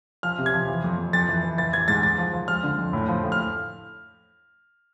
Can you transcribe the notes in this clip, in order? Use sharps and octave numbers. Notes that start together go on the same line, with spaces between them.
F3 F6
C3
G#6
F3
E3
F2
F2
F2 A6
E3
E3
E3 A6
E3 G#6
G#2 A6
G#2 A6
F3
F3
F3 F6
D3
F2
A2
F3
A2
F6